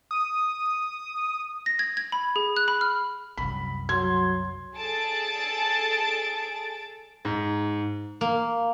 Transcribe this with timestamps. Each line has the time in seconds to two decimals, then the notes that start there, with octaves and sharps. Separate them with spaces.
0.11 D#6
1.66 A#6
1.79 G#6
1.97 G#6
2.12 B5
2.36 G#4
2.56 F#6
2.68 B5
2.81 F6
3.38 C2 F#2 B5
3.89 F#3 C6 G#6
4.75 G#4 A4 A5 A6 D7
7.25 G#2
8.21 A#3